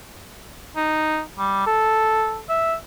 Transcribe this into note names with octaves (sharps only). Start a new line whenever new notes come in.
D#4
G3
A4
E5